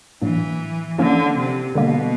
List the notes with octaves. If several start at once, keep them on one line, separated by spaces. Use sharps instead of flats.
A2 E3 F#3 A#3 D4
D3 F3 A#3 C#4 E4
C3
B2 D3 G3 A#3